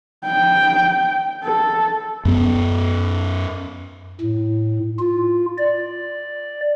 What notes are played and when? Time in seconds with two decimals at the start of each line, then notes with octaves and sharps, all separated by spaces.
0.25 G5
1.44 A4
2.25 F#2 B3
4.21 A2
4.99 F4
5.58 D5